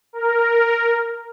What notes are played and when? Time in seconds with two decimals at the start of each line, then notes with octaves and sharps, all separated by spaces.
0.13 A#4